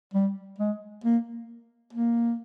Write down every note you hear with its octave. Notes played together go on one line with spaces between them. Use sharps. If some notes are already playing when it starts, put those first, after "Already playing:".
G3
G#3
A#3
A#3